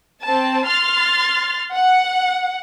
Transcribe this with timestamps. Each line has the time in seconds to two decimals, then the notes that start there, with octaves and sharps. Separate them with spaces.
0.23 C4 A5
0.67 C6 F6 A6
1.74 F#5